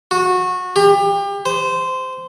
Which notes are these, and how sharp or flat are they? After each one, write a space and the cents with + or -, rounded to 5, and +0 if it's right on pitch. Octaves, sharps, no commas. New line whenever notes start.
F#4 -20
G4 +30
C5 -15